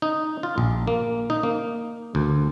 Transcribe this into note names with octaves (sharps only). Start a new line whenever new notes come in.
D#4
F4
A#1
A#3
D#4
A#3
D2